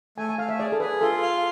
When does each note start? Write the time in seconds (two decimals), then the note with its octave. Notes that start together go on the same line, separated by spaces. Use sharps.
0.18 A3 G#5
0.29 G#5
0.38 A3 F5
0.49 E5
0.59 G#4 D5
0.72 A4
0.80 G#4 B4
1.01 F4 A4
1.22 F5